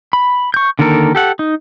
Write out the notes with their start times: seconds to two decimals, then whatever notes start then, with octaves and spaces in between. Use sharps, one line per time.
0.13 B5
0.54 C#6 G6
0.79 D3 D#3 A#3 A4 A#4
1.15 G4 A4 F#5
1.39 D#4